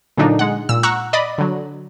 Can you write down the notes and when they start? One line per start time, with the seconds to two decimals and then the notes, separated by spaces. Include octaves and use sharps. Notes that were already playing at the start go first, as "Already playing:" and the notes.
0.17 A#2 D3 F#3 D4 D#4
0.39 G#3 F#5
0.69 A#2 E6
0.83 F#5 A#5 C#6 E6 F#6
1.13 D5 D#5 B5
1.38 D3 F#3